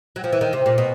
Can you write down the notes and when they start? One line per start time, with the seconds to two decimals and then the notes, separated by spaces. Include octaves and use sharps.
0.16 F#3
0.24 F3
0.33 E3
0.41 D#3
0.53 C3
0.66 A#2
0.78 B2